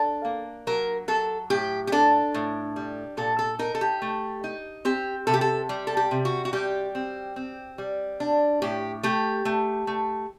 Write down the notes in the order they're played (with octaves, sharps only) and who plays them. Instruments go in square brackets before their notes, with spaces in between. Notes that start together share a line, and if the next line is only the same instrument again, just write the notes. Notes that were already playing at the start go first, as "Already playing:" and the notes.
Already playing: [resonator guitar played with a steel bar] D4 A4
A#3
F#3 A#4
F#3 A4
A2 G4
G4
D4 A4
A2
G3
A#2 A4
A4
D#4 A#4
A4
G4
A3
D#4
C4 G4
C3 A4
G4
A4
G3
A4
G4
C3
F#4
F#4
G3 G4
C4
C4
G3
D4
A2 G4
A3 G4
A3
A3